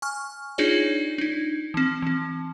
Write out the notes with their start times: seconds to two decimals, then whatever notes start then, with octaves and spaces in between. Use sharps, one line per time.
0.02 G#5 C#6 F6
0.58 D4 D#4 F4 G#4 C#5 D5
1.18 D4 D#4
1.74 E3 C4
2.02 E3 C4